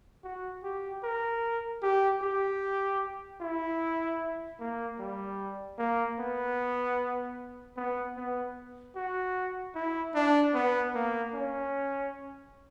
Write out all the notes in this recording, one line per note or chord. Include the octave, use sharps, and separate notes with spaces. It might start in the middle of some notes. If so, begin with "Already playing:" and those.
F#4
G4
A#4
G4
G4
E4
A#3
G3
A#3
B3
B3
B3
F#4
E4
D4
B3
A#3
C#4